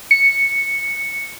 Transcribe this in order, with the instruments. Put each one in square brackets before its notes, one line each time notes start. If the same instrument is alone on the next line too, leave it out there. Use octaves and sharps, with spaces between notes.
[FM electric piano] C#7